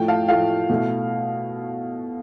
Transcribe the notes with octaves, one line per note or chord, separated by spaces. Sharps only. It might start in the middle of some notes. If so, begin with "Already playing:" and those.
Already playing: A2 F3 A3 G5
F5 A5
A2 F3 A3 F5
B2 A3 E4